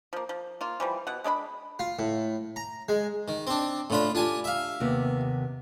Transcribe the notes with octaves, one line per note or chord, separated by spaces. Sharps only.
F3 A#3
F3
A#3 F4
E3 F3 G3
B2 F#5
G#3 D4 D5 B5
F4
A2
A#5
G#3
D#3
C4 D4
A2 A3 D4 F4 B5
D4 F4 G4 G#5
E5 F5
D#2 C3 B3